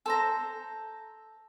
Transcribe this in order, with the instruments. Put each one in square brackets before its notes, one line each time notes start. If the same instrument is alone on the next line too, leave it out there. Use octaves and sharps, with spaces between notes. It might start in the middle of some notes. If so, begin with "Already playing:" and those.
[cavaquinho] A4 C5 A#5